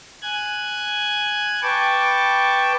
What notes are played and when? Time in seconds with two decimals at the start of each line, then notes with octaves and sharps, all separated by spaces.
0.22 G#5 F#6 G#6
1.63 B4 G5 A5 C#6 D6